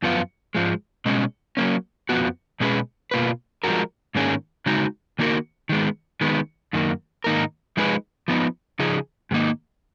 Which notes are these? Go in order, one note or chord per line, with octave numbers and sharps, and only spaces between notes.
F#2 F3 B3 F4
G#2 F3 G#3
B2 G#3 C#4
F#3 A#3 C#4
F2 F3 B3 F#4
B2 G#3 C#4 G#4 B4
B2 A#3 F4 B4
F3 G#3 B3 F#4 A#4
G#2 D#3 A#3 C#4 G#4
C#3 G#3 D#4 F#4
D#3 A#3 D#4 F#4 A#4
D#3 G#3 B3
D#3 G#3 B3
F#2 D#3 A#3
G#2 D#3 A#3 D#4 A#4
F3 G#3 D#4 G#4 B4
F3 B3 D#4
C#3 F3 D#4 G#4
G#2 D#3 A#3 D#4